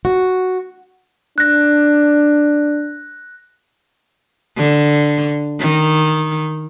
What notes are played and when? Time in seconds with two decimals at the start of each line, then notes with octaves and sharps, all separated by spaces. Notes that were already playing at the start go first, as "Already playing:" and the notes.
0.05 F#4
1.38 D4 F#6 A#6
4.57 D3
5.59 D#3